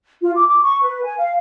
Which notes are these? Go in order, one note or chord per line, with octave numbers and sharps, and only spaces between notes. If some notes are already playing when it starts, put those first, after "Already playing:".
F4
D6
D6
C#6
B4
G#5
F5